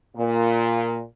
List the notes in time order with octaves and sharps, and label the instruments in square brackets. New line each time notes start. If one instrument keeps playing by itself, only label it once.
[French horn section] A#2